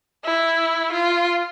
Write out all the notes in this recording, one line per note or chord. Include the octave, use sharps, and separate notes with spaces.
E4
F4